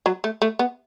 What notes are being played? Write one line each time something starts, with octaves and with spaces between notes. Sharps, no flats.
F#3
A3
A3
B3